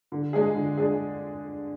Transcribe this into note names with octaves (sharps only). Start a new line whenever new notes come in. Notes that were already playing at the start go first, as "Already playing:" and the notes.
D3
G#3 D4 G#4
D3
G#3 D4 G#4